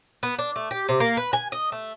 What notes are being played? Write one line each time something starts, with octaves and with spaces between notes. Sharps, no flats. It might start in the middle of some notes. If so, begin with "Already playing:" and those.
B3
D4
A3
G4
C3
A#3
B4
G#5
D#5
A3